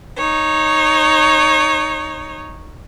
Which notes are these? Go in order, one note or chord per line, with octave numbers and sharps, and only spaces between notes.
D#4 C#5